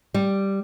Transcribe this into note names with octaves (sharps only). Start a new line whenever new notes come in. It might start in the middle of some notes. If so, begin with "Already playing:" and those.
G3